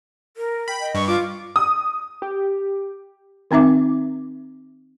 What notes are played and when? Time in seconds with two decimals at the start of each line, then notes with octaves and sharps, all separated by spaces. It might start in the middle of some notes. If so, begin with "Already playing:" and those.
0.37 A#4
0.68 G5 B5
0.80 D#5 G5
0.95 G2 C#6
1.07 F4 D6
1.56 D#6
2.22 G4
3.51 D#3 C4 D#4 E5 D6